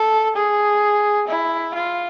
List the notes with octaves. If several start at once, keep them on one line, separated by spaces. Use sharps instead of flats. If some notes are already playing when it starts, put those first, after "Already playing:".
Already playing: A4
G#4
E4
F4